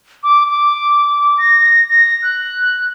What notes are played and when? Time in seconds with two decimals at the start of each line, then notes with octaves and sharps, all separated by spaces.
0.23 D6
0.48 D6
1.38 A#6
1.90 A#6
2.23 F#6